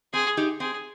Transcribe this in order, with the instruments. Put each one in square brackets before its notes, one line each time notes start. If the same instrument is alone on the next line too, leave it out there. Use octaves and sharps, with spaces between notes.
[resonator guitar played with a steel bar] C4 [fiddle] G#4
[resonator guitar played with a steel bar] D#4 G4
[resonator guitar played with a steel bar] C4 [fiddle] G#4